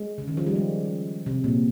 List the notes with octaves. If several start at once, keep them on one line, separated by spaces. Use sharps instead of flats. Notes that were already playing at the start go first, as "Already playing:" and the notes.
Already playing: G#3
C#3
D#3
F3
G3
G#3
C3
A#2